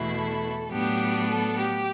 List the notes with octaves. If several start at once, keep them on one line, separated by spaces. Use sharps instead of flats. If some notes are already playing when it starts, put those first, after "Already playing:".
Already playing: E2 B2 A3 E4
A4
A2 F#3 B3 D4 G4
A4
G4